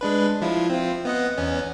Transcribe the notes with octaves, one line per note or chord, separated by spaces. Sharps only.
G#3 D4 B4
F3 E4 F4
C4 F4
B3 D#5 F#5
E2 B3 C#4